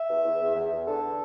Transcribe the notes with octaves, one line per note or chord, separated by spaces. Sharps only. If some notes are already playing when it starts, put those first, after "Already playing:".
Already playing: E5
E2
E2
E2
E2
E2
D3 A4